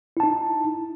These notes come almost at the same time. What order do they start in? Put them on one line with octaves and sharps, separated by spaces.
E4 A5 D#4